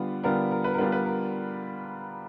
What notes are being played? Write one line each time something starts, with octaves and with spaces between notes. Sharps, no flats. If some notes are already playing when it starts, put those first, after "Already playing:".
Already playing: D3 G3 B3 D4 F4 B4
D3 G3 B3 D4 F4 A#4
A#4
B4
A#4
D3 G3 B3 D4 F4 B4
B4
A#4